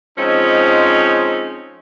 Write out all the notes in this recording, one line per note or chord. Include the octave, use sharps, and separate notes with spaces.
F3 G#3 C4 C#4 D#4